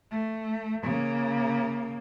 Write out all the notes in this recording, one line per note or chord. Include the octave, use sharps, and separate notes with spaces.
A3
C#3 A#3